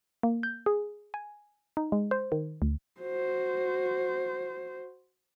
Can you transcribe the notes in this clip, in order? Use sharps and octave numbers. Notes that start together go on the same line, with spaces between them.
A#3
G6
G#4
G#5
D#4
G#3
C5
D#3
D2
F#4 C5